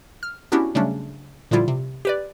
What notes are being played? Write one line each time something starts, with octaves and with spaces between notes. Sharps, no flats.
F6
B3 C#4 D4 E4 F#4 G4
C#3 F#3 G3 A3 C#4 D4
A#2 D3 F3 G3 E4 F4
C3
G4 B4 D5